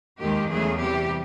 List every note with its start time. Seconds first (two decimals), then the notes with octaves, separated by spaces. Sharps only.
0.21 D#2 D#3 G#3 G4
0.50 E2 C#3 F#3 A3 G#4
0.80 C3 E3 G3 G4